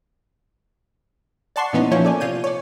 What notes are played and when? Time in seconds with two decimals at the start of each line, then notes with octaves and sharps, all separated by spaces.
1.56 D5 F#5 A5 C6 C#6 C7
1.73 A#2 E3 B3 C#4 D#4
1.91 F3 A#3 C#4 E4 C#5 G6
2.05 A4 D5 G#5
2.20 C3 F4 G6 D#7
2.44 C#5 D5